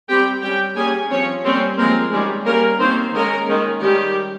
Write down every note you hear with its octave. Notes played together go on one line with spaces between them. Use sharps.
G3 C4 G4 G5
G3 C#4 G4 G5
G3 A#3 C#4 G#4 G#5
F3 C4 C#4 C#5
G3 A#3 C4 C#4 C5
F3 G#3 A#3 C4 A#4
D#3 G3 G#3 C#4 G#4
G3 A#3 C#4 A#4
D#3 A#3 C4 C#4 C5
D#3 G#3 A#3 C#4 A#4
D#3 G#3 C#4
D#3 G3 G#3 C#4 G4